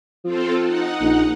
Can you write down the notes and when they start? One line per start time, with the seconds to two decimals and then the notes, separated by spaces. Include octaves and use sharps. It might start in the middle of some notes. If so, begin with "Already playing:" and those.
0.24 F3 C4 F4 A4
0.65 D#4 F#5
1.01 A#1